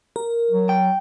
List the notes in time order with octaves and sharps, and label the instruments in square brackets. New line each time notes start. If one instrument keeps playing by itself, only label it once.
[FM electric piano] A#4
[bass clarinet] F#3
[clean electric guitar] G5